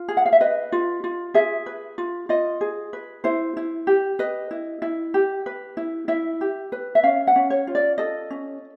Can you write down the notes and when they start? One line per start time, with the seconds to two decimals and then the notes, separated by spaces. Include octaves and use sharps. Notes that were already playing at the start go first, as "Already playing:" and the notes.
Already playing: F4
0.08 G#4
0.17 F#5
0.26 F5
0.33 E5
0.41 B4 D#5
0.72 F4
1.04 F4
1.34 G#4 E5
1.66 B4
1.98 F4
2.29 F4 D#5
2.61 G#4
2.93 B4
3.24 E4 C5
3.57 E4
3.87 G4
4.19 B4 D#5
4.51 E4
4.82 E4
5.14 G4
5.46 B4
5.77 E4
6.08 E4 E5
6.41 G4
6.72 B4
6.95 E5
7.03 C#4 F5
7.27 F#5
7.36 C#4
7.50 C#5
7.67 F4
7.75 D5
7.98 A4 D#5
8.30 C#4